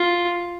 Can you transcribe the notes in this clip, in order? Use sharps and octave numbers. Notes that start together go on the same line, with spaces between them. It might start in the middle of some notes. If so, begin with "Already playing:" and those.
Already playing: F4